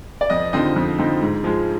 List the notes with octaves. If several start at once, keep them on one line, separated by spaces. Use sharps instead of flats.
D5
F2 D#5
D3 F3 C4 D#4 D#5
F2
D3 F3 C4 D#4
G#2
F3 G#3